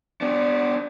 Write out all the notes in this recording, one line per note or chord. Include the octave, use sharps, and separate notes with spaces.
B3 D4